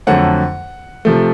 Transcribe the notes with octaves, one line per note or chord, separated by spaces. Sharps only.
F2 D3 F#3 A3 F#5
C3 F3 A3